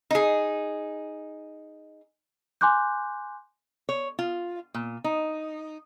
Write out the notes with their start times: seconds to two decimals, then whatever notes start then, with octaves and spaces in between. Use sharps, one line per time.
0.11 D#4 G#4
2.61 G#5 C6 D6 F#6 G6
3.89 C#5
4.19 F4
4.74 A#2
5.04 D#4